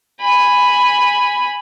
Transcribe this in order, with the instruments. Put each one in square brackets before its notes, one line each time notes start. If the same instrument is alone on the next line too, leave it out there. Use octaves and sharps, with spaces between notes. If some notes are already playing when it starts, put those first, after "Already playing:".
[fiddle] G#5 B5